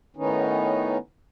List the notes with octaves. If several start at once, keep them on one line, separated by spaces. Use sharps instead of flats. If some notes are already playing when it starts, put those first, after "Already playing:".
A2 D#3 B3 C#4 D#4